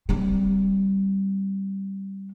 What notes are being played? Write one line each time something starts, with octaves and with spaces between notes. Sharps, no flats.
G3 C4